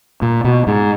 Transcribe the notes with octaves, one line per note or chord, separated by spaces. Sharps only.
A#2
B2
G#2